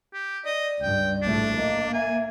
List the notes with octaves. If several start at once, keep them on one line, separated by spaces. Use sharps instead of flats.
G4
D5 D#5
C#2 G2 G5
A#1 A2 A3 D4
A#3 D#5
E5 G#5